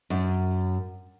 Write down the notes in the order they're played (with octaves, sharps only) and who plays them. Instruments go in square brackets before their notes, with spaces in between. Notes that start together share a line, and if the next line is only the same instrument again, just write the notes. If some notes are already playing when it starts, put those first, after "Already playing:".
[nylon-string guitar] F#2